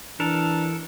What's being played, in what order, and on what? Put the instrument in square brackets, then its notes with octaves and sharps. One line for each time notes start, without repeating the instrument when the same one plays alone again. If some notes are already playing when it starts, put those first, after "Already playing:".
[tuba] E3 [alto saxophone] D4 [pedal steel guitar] A4 A#4